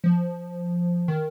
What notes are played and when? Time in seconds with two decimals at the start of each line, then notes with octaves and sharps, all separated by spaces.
0.04 F3
1.08 D#3